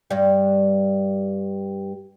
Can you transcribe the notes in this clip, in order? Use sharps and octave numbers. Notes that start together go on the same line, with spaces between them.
G2 G3